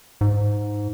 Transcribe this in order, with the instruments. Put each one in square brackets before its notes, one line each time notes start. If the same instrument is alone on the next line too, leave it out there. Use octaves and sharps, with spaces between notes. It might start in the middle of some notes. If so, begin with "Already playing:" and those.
[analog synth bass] G#2